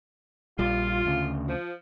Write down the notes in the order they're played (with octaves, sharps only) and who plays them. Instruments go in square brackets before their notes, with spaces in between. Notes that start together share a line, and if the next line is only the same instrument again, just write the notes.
[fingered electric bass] A#1 G3 [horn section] F4
[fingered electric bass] D2 C#3
[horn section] F3